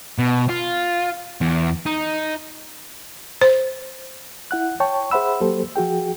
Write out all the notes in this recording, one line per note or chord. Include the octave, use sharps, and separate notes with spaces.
B2
F4
E2
D#4
C5
E4 F#5 F#6
C#5 G5 A5 C#6
G#4 C5 E5 F#5 B5 E6
F#3 A#3 G4 A4 C5
F3 F#4 G#4 G5